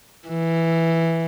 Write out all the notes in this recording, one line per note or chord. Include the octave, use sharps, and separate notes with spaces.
E3